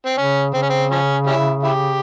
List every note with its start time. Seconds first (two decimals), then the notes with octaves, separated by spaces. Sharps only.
0.06 C4
0.18 C#3 C#4
0.54 C#3 C4
0.62 C#4
0.70 C4
0.91 F3 C#4
1.27 G3 C#4 E4
1.63 E4 G4